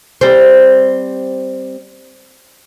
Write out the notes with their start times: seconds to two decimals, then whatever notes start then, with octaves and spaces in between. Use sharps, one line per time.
0.21 G3 C4